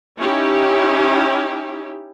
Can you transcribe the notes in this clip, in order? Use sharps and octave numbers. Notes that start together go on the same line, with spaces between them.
C#4 D#4 E4 G4